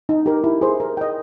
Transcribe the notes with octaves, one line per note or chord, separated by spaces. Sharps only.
D#4
G4 A#4
E4
G#4 C5
A#4
D#5 G5